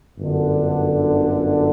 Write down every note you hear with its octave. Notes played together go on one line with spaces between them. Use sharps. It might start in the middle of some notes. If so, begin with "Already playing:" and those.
G1 F#2 D3